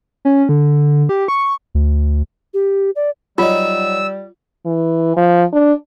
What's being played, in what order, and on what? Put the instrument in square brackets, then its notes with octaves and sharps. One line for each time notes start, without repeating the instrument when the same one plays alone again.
[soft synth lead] C#4
D3
G4
C#6
[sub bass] D2
[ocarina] G4
D5
[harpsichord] F#3 D#4 [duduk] G3 [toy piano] F4 [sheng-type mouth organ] E6
[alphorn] E3
F3
D4